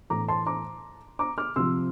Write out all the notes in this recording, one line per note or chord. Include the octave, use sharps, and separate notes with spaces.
A2 E3 A#5 D6
A5 C6
A#5 D6
A#5 D6
D6 F6
C3 F3 C6 E6